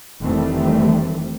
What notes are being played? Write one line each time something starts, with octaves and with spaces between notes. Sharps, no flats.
F1 D#3 E3 G3 A3 C4